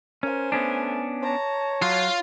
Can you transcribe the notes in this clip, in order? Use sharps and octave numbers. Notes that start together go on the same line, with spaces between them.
C#4 A#4 C5 G#5
A3 B3 C#4 D4
C#5 A5 A#5
F#3 F4 F5